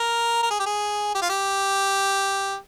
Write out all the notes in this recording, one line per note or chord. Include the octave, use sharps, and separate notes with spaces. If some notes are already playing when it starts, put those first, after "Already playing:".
Already playing: A#4
A#4
G#4
G4
G#4
G4
F4
G4